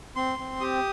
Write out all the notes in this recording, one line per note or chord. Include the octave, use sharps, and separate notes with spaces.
C4 C6
C4
G4 D#6